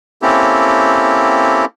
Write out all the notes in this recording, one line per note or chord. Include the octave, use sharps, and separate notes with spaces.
A#3 C4 C#4 E4 G4 A4